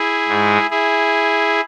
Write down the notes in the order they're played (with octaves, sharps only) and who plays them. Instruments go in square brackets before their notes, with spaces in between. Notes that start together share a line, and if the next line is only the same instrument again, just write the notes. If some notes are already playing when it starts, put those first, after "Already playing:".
Already playing: [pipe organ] E4 G#4
G#2 G#3
E4 G#4